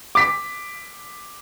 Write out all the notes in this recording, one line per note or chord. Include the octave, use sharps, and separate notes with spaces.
D6 B6